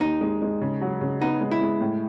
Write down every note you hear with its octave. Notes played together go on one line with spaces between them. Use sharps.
D#2 D#4
G#3
G#3
C#3
F#3
C#3
B3 D#4
G#3
E4
G#3
A2